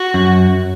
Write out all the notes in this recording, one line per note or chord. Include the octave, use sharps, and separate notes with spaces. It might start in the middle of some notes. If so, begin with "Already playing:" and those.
Already playing: F#4
F#2